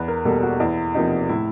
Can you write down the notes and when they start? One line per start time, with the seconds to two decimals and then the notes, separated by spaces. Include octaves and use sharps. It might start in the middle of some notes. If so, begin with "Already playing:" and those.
Already playing: E2 B4
0.08 A#4
0.25 B2 G3 A#3 A4
0.43 F#4
0.60 E2 E4
0.94 C3 F3 A#3 D#4
1.29 A2 E4